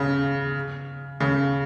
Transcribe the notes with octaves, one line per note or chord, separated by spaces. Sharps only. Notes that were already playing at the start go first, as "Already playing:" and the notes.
Already playing: C#3
C#3